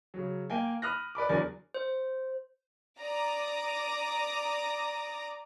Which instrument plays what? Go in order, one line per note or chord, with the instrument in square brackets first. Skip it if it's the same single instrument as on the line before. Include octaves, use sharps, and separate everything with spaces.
[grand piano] C#3 F#3
A#3 G5 G#5
B5 D#6 F6 F#6 A#6
B4 D5 B5 D6
E2 F#3 D4 A#4 G#5 A6
[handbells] C5
[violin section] D5 A#5 D6 D#6